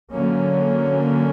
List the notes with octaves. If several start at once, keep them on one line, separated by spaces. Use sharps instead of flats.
D3 F#3 A#3 C#4